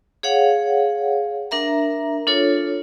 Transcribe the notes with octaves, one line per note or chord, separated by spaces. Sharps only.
G#4 C#5 F5 F#5
D4 A#4 E5 A#5
D4 F4 A4 C#5